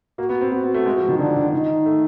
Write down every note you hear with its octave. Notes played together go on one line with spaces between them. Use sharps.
A#3 F#4
B3
C4
B3 F#4
B3
A3
G#3
F3
D#3
D3 D4
D3
D#3 D#4
A3